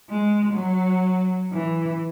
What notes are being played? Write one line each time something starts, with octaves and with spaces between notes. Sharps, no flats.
G#3
F#3
E3